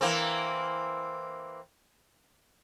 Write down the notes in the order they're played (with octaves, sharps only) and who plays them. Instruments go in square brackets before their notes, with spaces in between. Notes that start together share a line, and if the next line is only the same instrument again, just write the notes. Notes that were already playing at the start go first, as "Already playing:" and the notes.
[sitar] E3 A#3 C4